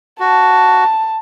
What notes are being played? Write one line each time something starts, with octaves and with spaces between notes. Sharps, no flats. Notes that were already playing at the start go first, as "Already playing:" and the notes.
F#4 A5